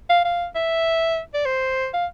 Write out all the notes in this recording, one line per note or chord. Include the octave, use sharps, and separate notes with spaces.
F5
F5
E5
D5
C5
F5